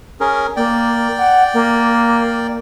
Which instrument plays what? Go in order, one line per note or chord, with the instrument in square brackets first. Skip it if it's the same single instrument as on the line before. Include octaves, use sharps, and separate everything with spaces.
[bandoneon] C#4 G#4 A#4
[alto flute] A#3 [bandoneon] D5 G5
[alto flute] F#5
A#3